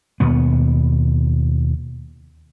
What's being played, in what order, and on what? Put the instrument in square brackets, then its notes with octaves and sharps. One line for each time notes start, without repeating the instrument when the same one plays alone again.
[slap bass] D#2 B2 B3